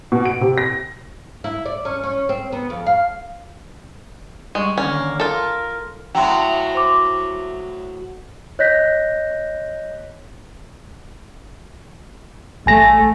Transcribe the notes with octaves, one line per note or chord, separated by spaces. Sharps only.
B2
D7
C3
A#6
E4
D5
C#4
C#4
C4
B3
F2
F5
G3 G#3 C#6
D3 D#3 A#3 C#4
F4 A4 A#4
A2 F#3 G5 C6
C5 C6 D6
C#5 D#5 F#6 G6 A#6 B6
A1 A3 G#5 A#6